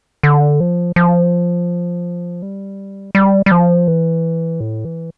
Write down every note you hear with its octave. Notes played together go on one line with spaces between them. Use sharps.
D3
F3
F3
G3
G3
G3
F3
E3
A2
E3